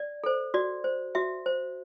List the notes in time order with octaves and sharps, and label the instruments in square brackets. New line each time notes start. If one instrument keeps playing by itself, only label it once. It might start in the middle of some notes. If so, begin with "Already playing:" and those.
Already playing: [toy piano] D5
A4 C5
F#4 D5
C5
F#4 E5
C5